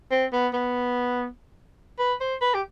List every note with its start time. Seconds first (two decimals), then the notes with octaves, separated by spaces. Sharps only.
0.11 C4
0.32 B3
0.53 B3
1.99 B4
2.20 C5
2.41 B4
2.54 G4